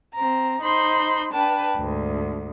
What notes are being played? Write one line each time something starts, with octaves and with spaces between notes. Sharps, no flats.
C4 A#5
D#4 C5 B5 C6
D4 B4 G5 A5
D2 G#2